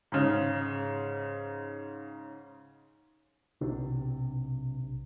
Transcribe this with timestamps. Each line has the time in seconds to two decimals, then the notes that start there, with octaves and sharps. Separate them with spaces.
0.12 G#2 C#3
3.61 B1 C3 D4